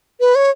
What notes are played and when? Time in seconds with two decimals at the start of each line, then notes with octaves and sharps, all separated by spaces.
0.20 B4
0.35 C#5